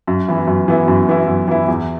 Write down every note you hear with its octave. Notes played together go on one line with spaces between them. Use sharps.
F#2
E3 B3 E4
F#2
E3 B3 E4
F#2
E3 B3 E4
F#2
E3 B3 E4
E2